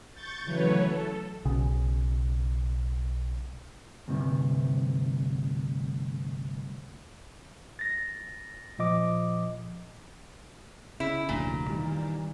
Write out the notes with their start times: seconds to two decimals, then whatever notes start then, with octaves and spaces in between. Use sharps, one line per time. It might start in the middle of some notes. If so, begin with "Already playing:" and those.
0.12 C#6 G6 A6
0.44 C#3 E3 F#3 A3 B4 C#5
0.82 A4
1.45 B1 C#3
4.08 D2 G2 C3
7.79 A6 A#6
8.79 A#2 F3 D#5 D6
11.00 C#3 E4
11.29 F1 D2 A#2
11.68 D#3 E3 G3